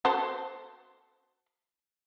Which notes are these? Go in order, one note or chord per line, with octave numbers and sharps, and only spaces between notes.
F#4 A4 C5